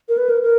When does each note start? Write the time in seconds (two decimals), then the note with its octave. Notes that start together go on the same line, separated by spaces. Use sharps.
0.09 A#4
0.18 B4
0.30 A#4
0.42 A#4